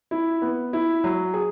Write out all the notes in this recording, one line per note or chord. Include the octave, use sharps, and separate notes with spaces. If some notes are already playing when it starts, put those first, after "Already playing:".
E4
B3
E4
F#3
G#4